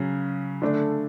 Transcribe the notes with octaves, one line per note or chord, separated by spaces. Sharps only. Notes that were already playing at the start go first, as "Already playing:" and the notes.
Already playing: C#3 F#3 C#4
D3 A3 D4